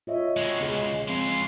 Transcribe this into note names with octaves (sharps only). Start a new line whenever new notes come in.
F4 C#5 D#5 E5
G#3 F#4
C#2 B3 G#4
C#3 F3 G#3 C4 F5